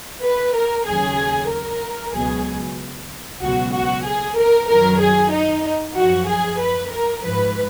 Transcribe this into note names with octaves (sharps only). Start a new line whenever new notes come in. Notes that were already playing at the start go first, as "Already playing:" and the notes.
B4
A#4
D#2 C#3 F#3 G#4
A#4
C#2 B2 F#3 G#4
C#2 B2 F#3 F#4
F#4
G#4
A#4
F#2 D#3 F#3 A#4
G#4
D#4
F#2 F3 F#4
G#4
B4
A#4
G#2 F3 B4